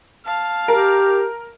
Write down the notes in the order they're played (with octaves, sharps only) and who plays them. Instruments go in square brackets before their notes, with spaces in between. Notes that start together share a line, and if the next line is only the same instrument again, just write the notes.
[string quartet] F5 A5 F6
[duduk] G4 [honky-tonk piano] A#4